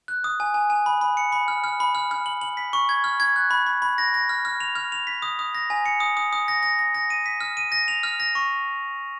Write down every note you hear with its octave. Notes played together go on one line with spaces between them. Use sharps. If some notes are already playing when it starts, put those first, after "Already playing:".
F#6
D#6
G#5
G#5
G#5
B5
B5
C#7
B5
F6
F6
B5
F6
F6
F#7
F#7
B6
C#6
G#6
F6
G#6
F#6
B5
B5
B5
A#6
A#6
F6
F6
F7
F6
F7
B6
D#6
D#6
A#6
G#5
C#7
D#6
D#6
D#6
A#6
A#6
A#6
A#6
D#7
B6
F6
D#7
A#6
F7
F6
A#6
C#6